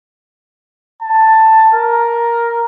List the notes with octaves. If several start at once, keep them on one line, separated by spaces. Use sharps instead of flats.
A5
A#4